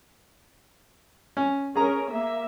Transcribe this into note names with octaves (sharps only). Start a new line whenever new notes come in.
C#4
C#4 G#4 A#4 A#5
A#3 E5